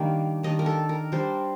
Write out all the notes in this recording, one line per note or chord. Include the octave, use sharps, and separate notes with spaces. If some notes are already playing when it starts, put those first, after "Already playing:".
Already playing: D#3 G3 A#3 D4
D#3 G3 D4 D#5
A#4
A4
A#4
G3 D4 C5